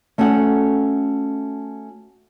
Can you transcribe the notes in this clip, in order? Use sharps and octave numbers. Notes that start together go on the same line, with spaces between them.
A3 C#4 F#4 A4 F#5